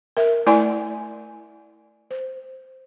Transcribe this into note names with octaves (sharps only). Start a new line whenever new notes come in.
A#4 E5
A3 E4 D5 G#5 C6
C5